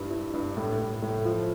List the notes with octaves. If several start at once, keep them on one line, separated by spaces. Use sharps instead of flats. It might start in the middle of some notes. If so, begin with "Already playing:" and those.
Already playing: G2 E4
E4
G2
A2
A2
A2
F3